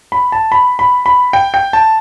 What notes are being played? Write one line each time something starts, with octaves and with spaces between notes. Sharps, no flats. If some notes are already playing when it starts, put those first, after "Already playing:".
B5
A5
B5
B5
B5
G5
G5
A5